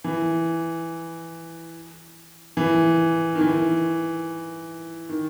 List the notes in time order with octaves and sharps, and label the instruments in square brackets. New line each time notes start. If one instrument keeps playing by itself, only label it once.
[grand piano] E3
E3
D#3
E3
D#3